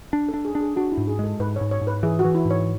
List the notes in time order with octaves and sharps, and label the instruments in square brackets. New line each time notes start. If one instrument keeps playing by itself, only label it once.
[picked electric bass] D4
[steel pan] A4
[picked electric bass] D4
[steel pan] G#4
[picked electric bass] D4
[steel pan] G#4
[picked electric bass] D4 [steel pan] F#4
[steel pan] E4
[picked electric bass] G#2
[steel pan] G#4
[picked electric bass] G#3 [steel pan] A4
[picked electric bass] G#2 [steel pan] B4
[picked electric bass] G#2 [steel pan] C#5
[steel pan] C#5
[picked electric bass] G#2
[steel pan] B4
[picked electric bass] E3 [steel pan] G#4
[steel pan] F#4
[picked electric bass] E3
[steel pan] E4
[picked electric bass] G#2
[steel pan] C#5